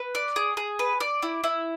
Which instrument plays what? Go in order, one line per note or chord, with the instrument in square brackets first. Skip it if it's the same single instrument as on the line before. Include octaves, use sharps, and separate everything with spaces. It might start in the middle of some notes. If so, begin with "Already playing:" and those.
Already playing: [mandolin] B4
D5
G#4
G#4
B4
D5
E4
E4